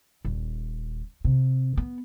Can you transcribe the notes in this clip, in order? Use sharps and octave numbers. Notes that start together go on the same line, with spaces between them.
D#1
C3
B3